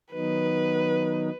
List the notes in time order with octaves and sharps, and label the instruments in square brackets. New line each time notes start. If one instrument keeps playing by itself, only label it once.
[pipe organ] D#3 F#3 B3 D#4 [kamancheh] B4